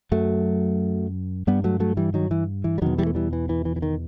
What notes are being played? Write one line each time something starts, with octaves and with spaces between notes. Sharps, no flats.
F#2 F#3 A3
G2 G3 B3
F#3 A3
F#3 A3
E3 G3
D#3 F#3
E3
E3
G3
E2 B2 D#3 F#3
E3 G3
A3
E3 G3
E3
E3
E3
E3
D#3